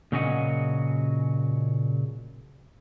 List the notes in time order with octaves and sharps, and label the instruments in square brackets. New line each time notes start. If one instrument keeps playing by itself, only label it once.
[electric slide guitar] A#2 C#3 F#3 C#4 D#5 F#5